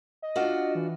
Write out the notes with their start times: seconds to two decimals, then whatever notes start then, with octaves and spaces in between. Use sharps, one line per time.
0.22 D#5
0.36 D4 F4 F#4
0.75 E3